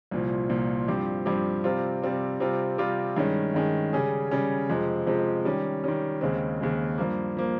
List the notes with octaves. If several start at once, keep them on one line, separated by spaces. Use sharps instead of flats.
C2 A#2 F3
C2 A#2 F3
G2 F3 C4 G4
G2 F3 C4 G4
C3 G3 C4 F4
C3 G3 C4 F4
C3 G3 C4 F4
C3 G3 C4 F4
G2 D#3 G#3 C#4
G2 D#3 G#3 C#4
C#3 G3 C#4 G#4
C#3 G3 C#4 G#4
F2 C3 F3 G#3
F2 C3 F3 G#3
D#3 G3 C#4
D#3 G3 C#4
D#2 C#3 G#3 C4
D#2 C#3 G#3 C4
G2 F3 A#3
F3 A#3